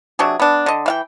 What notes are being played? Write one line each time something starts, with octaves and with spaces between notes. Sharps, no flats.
C3 F#3 D4 G#4
B3 D4
D3 D#5
E3 F5 G5